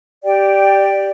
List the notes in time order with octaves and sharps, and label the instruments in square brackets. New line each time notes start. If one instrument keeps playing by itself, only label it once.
[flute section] G4 D5 G5